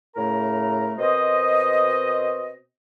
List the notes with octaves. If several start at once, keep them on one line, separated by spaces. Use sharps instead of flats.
A2 C#3 A3 A#4 A#5
B2 C4 A#4 C5 D#5